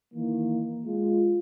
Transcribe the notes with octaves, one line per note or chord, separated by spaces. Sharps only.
D#3 E3 A#3
G#3 F4